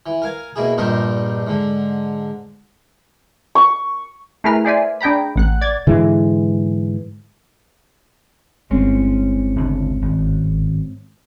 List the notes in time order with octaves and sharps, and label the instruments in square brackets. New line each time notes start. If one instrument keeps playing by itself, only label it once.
[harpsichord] E3
A#4 F5 G#5
B2 A#3 E4 G#4
A#1 G2 D4 D#4 A#4 C5
G#2 D3
[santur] C#6
[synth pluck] A3 E4 G#4 A#4 B4 F6
G#4 C5 D5 E5 G#5
D4 G#4 G5 A#5 B5
A1 F#5 F#6
D5 G#6 A6
[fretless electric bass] G#2 D3 E3 G#3
[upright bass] G1 E4 [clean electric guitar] G#3 C4 C#4
[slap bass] D1 C#2 D4
G#1